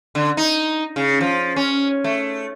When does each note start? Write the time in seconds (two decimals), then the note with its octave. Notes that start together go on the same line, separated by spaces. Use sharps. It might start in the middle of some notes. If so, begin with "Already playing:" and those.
0.15 D3
0.37 D#4
0.96 C#3
1.21 F3
1.56 C#4
2.04 A3